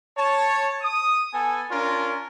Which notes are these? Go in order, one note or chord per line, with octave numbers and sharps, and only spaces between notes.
C#5 A5
D#6
B3 A4 G#5
C#4 D4 F4 A#4